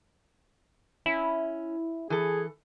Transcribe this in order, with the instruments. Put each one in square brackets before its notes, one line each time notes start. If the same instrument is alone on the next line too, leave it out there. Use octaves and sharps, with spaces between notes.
[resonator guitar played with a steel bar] C#4 [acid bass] E4
[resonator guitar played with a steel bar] E3 A4 [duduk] G#4